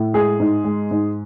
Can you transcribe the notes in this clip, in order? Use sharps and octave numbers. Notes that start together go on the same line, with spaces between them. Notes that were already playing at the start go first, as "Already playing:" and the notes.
Already playing: A2
G#3 G#4
G#2
G#3
G#2